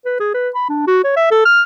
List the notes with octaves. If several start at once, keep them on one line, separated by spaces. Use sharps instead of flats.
B4
G#4
B4
B5
D4
F#4
C#5
E5
A4
F6